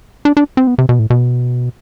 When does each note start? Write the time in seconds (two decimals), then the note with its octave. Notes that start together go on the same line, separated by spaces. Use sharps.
0.25 D4
0.37 D4
0.57 C4
0.67 B3
0.78 C3
0.89 B2
0.99 A2
1.10 B2